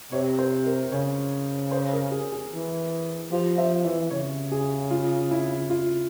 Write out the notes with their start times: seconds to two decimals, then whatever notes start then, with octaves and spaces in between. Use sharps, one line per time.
0.12 C3 C#5
0.39 C5
0.66 A#4
0.92 C#3 C#5
1.71 C5
1.93 A#4
2.11 G#4
2.32 G#4
2.51 E3
3.31 F3 G4
3.58 F3 E5
3.84 E3 E5
4.11 C#3 C#5
4.52 G#4
4.91 F4
5.31 E4
5.70 F4